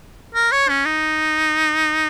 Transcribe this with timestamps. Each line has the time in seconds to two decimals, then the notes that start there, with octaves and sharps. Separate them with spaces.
0.35 A#4
0.52 C#5
0.69 C#4
0.86 D#4